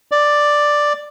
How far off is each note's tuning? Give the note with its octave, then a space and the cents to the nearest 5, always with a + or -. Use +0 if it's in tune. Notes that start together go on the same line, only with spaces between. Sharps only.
D5 +5